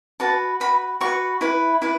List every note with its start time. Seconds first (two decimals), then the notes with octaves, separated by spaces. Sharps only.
0.20 F#4 B4 A5
0.60 F#4 B4 B5
1.01 F#4 B4 C#6
1.41 E4 B4
1.82 E4 B4